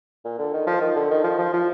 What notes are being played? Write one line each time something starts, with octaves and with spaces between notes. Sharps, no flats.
A#2
D3
D#3
F3
D#3
D3
D#3
F3
F3
F3